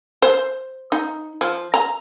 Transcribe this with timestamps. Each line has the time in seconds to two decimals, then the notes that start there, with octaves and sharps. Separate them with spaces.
0.22 C5
0.92 D#4
1.41 F3
1.74 A#5